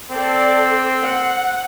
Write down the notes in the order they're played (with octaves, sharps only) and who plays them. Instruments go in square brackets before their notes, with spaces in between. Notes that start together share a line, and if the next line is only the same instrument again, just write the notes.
[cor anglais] C4 [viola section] A4 D5
[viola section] F#5